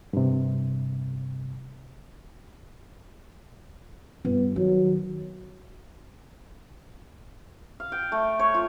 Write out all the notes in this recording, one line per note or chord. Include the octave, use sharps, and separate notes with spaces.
G2 C3
G1 B3
D#3 F#3
F5
G5
A3
C#5
F4